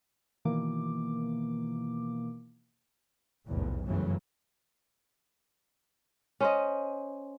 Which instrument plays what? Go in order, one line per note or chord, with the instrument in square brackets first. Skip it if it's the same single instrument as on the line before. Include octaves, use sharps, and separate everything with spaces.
[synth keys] B2 D#3 E3 A#3 D6
[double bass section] F1 B1 E2 A2
G1 F#2 C#3 E3 F#3 A3
[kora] C#4 C5 D#5